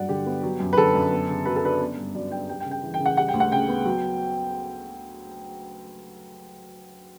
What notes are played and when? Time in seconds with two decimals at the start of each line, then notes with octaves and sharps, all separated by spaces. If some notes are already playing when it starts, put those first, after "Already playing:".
Already playing: G2 F#3 D5 F#5
0.09 D3 G4
0.26 B3
0.43 F#3
0.60 F#2
0.73 B4
0.77 D3 A4
0.95 F#2
1.12 B3
1.29 C#3
1.46 F#3 B4
1.56 A4
1.64 D4 B4
1.80 B3
1.97 G2
2.15 F#3 D5
2.32 D4 G5
2.48 G3 G5
2.60 G5
2.65 C#3
2.71 G5
2.83 E3
2.94 G5
3.00 C#3
3.06 F#5
3.17 G3 F#5
3.28 G5
3.34 D2
3.40 F#5
3.52 C#3 G5
3.69 B3
3.85 F#3